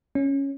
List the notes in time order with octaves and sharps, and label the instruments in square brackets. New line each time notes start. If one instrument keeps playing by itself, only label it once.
[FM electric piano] C#4